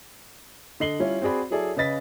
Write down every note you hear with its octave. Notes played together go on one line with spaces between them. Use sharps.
D3 D#5 C7 F#7 G7
G3 C#4 E4 F4
C4 F#4 G#4 D5 B5
F#3 E4 G#4 A4 D5
C#3 B4 D#5 A6 B6